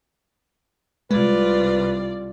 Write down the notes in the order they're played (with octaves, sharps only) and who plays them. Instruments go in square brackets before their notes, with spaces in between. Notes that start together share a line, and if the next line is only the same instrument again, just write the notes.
[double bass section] C2 C3 [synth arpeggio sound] G#3 [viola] F4 D5 [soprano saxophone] B4